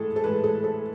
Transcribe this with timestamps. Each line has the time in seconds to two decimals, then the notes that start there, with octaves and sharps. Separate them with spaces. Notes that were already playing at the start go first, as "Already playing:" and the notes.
Already playing: A2 E3 G#3 G#4 A4
0.16 A4
0.23 A2 E3 G#3 B4
0.44 A4
0.64 A4